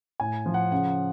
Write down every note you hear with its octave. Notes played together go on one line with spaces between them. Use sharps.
A2 G#5
F3
F#5
C#3 F#5